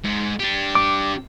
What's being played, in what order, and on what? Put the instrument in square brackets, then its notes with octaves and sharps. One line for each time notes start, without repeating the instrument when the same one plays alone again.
[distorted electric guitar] G#2
D4 G4
[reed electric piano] D6